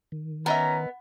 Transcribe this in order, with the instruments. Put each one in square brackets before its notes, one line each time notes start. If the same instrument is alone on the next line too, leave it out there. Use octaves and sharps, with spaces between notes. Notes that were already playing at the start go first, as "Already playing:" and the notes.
[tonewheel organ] D#3
[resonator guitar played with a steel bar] B3 [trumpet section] C#4 A#5 [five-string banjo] A#4 D#5 E5